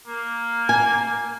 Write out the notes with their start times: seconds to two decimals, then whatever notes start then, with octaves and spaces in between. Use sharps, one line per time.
0.07 A#3
0.69 G#5